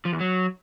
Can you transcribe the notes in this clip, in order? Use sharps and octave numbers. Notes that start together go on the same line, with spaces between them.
F3
E2
F#3